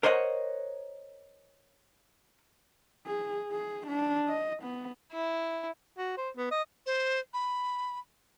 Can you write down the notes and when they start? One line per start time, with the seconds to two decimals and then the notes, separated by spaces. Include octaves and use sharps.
0.03 A#4 C5 C#5 D#5 F#5
3.06 G#4
3.51 G#4
3.87 D4
4.28 D#5
4.63 B3
5.12 E4
5.98 F#4
6.18 C5
6.37 B3
6.51 D#5
6.86 C5
7.33 B5